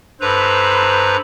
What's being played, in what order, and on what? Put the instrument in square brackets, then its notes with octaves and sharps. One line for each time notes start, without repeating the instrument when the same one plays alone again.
[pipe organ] G2 B4 A#5 [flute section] A4 B5 E6 [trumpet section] C5